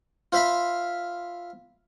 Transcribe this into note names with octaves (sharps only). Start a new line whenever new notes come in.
F4 C5 E5 F5 B5